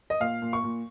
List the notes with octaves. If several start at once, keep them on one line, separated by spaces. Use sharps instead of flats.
D#5
A#2 F5
A#2
C#6
A#2